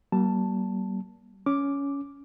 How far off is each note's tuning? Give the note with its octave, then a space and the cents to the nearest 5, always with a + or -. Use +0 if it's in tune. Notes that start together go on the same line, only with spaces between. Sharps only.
G3 -40 A#3 +25 A5 +5
C#4 +15 D6 +0